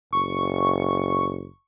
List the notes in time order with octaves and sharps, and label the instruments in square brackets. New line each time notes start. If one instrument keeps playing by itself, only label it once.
[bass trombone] F#1 [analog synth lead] C#6